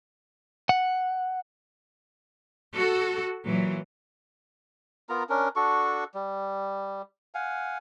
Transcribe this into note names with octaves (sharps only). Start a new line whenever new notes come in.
F#5
F#4 A4
A#2 E3 F#3
B3 F4 A#4 A#5
C#4 D4 A#4
D4 F#4 A4 C#6
G3
F5 F#5 G#5